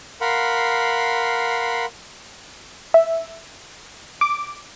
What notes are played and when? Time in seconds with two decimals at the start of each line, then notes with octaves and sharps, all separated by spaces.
0.21 A#4 F5 F#5 B5 C6
2.94 E5
4.21 D6